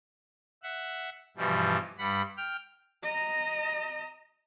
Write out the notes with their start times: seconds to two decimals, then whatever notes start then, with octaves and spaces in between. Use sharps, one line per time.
0.63 E5 F#5
1.37 G2 B2 E3 F3 G3
1.98 G2 G3 F#5 B5
2.37 G5 F6
3.03 D#5 A#5